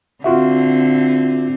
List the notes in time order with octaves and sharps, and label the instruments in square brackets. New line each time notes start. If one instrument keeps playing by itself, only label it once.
[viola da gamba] D3 C4 [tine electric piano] F4 F#4 E5